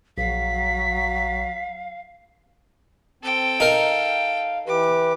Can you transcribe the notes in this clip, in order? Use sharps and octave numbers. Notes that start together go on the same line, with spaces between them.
A#1 F#3 F5 B6
C4 A4 G5
D#4 A#4 F5
E3 G4 B4 D6